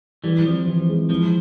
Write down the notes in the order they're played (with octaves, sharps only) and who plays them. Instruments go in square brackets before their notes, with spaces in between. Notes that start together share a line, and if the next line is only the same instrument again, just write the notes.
[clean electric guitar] E3 G3 [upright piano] G4
[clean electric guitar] G3
[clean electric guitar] F3 [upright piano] C4
[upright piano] E3
G#3
[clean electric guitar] F3 [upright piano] E4